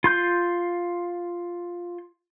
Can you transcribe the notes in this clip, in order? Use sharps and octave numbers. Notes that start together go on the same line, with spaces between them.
F4 C6 G6